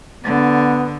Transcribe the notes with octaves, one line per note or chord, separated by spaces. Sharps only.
D3 B3